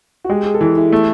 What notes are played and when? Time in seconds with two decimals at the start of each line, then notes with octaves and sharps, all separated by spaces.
0.24 F#4
0.30 G#3 G4
0.45 G#4
0.54 A4
0.61 E3 G#4
0.77 E4
0.92 A3